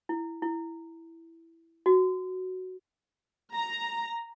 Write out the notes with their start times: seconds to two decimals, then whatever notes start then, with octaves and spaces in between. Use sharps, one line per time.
0.09 E4
0.42 E4
1.86 F#4
3.53 A#5